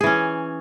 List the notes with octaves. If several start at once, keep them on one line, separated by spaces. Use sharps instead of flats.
E3 C#4 G#4